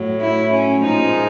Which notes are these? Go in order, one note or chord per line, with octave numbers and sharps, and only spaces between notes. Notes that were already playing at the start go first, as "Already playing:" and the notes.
Already playing: A2 F#3
E4
C#4
A#2 F3 G#3 D#4